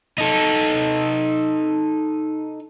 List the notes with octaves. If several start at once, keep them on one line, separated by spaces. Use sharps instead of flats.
D#4 A4